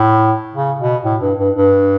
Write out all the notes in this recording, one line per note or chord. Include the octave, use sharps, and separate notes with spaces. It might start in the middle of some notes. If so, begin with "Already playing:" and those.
Already playing: A2
C#3
B2
A2
G2
G2
G2